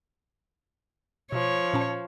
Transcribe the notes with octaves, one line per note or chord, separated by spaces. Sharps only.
B2 F3 C#5
A#2 C#4 A5